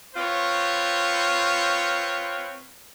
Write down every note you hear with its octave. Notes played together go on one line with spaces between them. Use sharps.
C4 F4 B4 C#5